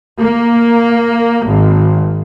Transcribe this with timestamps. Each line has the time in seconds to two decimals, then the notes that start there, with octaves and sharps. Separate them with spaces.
0.19 A#3
1.46 G#1